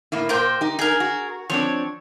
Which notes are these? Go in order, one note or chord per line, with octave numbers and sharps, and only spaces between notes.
A2 A#3 E4
A#2 A#4 C5 G5
D#4 G4
D#4 G#4 A#4
F#4
F3 C4 D4 C#5